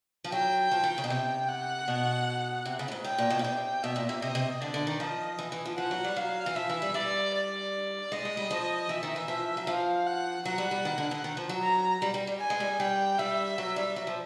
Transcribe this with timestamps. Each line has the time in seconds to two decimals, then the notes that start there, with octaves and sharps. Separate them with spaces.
0.24 F3
0.32 F#3 G5
0.71 F3
0.84 D#3
0.98 C#3
1.04 B2
1.10 C3 G5
1.49 F#5
1.88 B2
2.65 C3
2.79 C#3
2.88 A2
2.92 G#2
3.04 A2 G5
3.18 A#2
3.30 B2
3.39 C#3
3.44 C3 G5
3.83 B2 E5
3.96 A#2
4.09 C3
4.22 C3 D#5
4.35 C3
4.60 D3 D5
4.74 D3
4.87 D#3
5.00 F3 D#5
5.39 E3
5.52 E3
5.66 F3
5.78 F3 F#5
5.91 F#3
6.05 G3
6.17 F#3 F5
6.46 E3
6.55 F3 E5
6.69 E3
6.82 G3
6.94 G3 D5
7.34 D5
8.12 G#3 D#5
8.25 G#3
8.37 G3
8.51 F3
8.89 E3 E5
9.03 D#3
9.16 E3
9.28 F3
9.57 F#3
9.67 F3 F5
10.07 F#5
10.45 F#3 F#5
10.58 G3
10.71 G3
10.85 D#3
10.98 D3
11.11 D3
11.24 D#3
11.37 F3
11.49 F#3
11.63 A#5
12.02 G3
12.14 G3
12.27 G3
12.40 G#5
12.50 G#3
12.60 G3
12.80 G3 G5
13.19 G3 E5
13.58 F#3
13.76 G3
13.96 F#3
14.07 F3